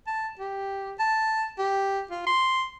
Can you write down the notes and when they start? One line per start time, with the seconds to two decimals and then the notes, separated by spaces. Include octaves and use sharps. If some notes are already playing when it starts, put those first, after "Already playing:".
0.07 A5
0.39 G4
1.00 A5
1.58 G4
2.10 F4
2.27 C6